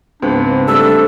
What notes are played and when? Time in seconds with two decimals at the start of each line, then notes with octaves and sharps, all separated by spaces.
0.22 C#2 G#2 B3 C4 D4
0.68 G3 A3 C4 A4 E6